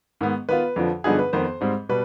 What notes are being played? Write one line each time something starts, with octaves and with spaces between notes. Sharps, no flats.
G#2 D#3 B3
D#3 B3 F4 B4
F2 D3 F3
G2 D3 F3 B3 D#4 G#4
B4
F2 D#3 B3 C5
G#2 G3 C4
B2 G3 B4